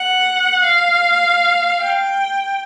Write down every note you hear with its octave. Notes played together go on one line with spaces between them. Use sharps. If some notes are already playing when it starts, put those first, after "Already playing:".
Already playing: F#5
F5
G5